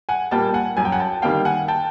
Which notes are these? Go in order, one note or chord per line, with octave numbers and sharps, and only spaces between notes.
F#5 G#5
A#2 G3 A#3 G5 A5
F#5 G#5
F#2 G#5
G5
F#5 G#5
G5 A5
D#3 G3 A#3 F5 G5
F#5 G#5
G5 A5